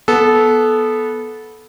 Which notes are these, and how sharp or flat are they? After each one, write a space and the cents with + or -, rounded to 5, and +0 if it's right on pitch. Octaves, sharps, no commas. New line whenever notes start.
B3 -15 A4 -20